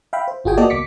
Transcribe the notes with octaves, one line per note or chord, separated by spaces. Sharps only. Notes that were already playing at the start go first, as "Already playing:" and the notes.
E5 F5 G5 B5
C5
G1 F4 F#4 G#4 G5 G#5
A#3 B3 F#4 D5 D#5 A5
C#2 D6 B6 C#7